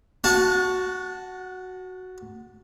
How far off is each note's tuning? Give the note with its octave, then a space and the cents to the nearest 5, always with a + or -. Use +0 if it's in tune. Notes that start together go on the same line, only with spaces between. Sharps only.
F#4 +0 F#5 -40 A5 +0